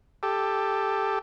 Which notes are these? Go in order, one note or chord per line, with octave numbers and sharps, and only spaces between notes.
G4 A4